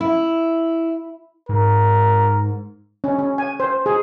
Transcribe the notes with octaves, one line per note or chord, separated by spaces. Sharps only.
E4
G#2 A#4
C#4
C#4
G#5
C5
G#4